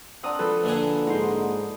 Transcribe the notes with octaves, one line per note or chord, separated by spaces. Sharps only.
C4 D4 F#5 A#5 D#6
F3 A4 B4 F#5
A#1 D3 G#4
G#2 D#4 C5